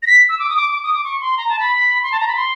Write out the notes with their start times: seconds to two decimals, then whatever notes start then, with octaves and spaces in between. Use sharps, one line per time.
0.03 A#6
0.07 B6
0.29 E6
0.39 D6
0.49 D#6
0.56 D6
0.72 D6
0.83 D#6
0.94 D6
1.04 C#6
1.21 C6
1.37 A#5
1.49 A5
1.60 B5
2.03 C6
2.12 A5
2.20 A#5
2.28 B5
2.36 C6